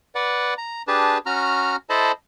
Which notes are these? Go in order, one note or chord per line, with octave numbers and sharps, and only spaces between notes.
B4 D5 F#5
A#5
D4 G4 G#4 B4 A5
C#4 F#4 A#5 F6
E4 A4 C5 D#5 A5 B5